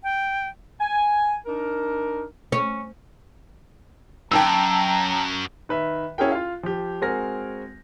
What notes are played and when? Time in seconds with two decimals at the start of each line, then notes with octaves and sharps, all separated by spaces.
0.03 G5
0.80 G#5
1.45 D4 D#4 A#4
2.52 C#4
4.31 F#2 G5 A5 A#5 E6
5.69 D#3 B4 E5
6.18 C#4 E4 F#4 G#4 A#4 G5
6.32 F4 F5
6.63 F3 G4
7.01 G#3 C4 F#4 A#4 G#5 A#6